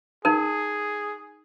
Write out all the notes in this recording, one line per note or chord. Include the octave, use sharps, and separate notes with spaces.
D#4 G#4 A#4